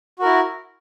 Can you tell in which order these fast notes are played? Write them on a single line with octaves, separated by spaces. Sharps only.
F#4 A#4 E4